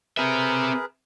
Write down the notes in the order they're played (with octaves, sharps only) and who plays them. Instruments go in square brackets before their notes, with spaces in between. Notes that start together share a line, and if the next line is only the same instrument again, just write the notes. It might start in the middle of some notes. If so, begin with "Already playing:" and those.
[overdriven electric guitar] C4 E5 [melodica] G#4 A#4 B4